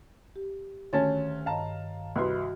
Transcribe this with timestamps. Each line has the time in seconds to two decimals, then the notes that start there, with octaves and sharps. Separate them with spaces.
0.36 G4
0.93 D2 D#3 C#4 C#5 A5 A6
1.46 G2 D#5 F5 A5 A#5
2.16 C2 F#4 B4 D#5 C6